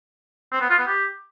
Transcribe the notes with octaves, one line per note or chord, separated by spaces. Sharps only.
C4
B3
F4
B3
G4